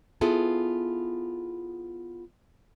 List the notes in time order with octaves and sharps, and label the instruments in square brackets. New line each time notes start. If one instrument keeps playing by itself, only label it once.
[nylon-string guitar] B3 E4 F4 G#4 A4